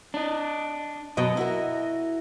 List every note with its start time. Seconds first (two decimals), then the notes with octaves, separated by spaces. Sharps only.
0.14 D4 D#5
1.17 F#2 B2 F#3 D#5
1.37 E4 F#4 A#4